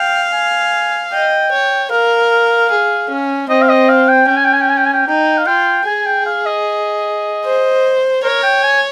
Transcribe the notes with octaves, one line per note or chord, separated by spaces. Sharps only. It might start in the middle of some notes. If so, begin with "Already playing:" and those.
Already playing: F5 G5
G#5
D#5 G5
C#5
A#4 F5
G#4
C#4
C4 D#5
F5
D#5
F5
G5
C#4 G5
G#5
G5
G#5
G5
G#5
G5
G#5
G5
D#4 G5
F5
F4 G5
G#4 G#5
G5
F5
D#5
C5
A#4 C#5
G5
G#5